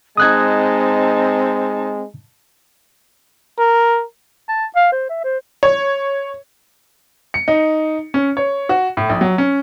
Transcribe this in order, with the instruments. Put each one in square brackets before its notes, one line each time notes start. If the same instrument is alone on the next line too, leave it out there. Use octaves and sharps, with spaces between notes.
[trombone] G#3 [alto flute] C4 [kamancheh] D#4 A5 [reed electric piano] D#6 F#6 G#6
[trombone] A#4
[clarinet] A5
F5
C5
E5
C5
[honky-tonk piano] C#5
[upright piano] C#7
D#4
C#4
C#5
F#4
A2
A#1
F#3
C#4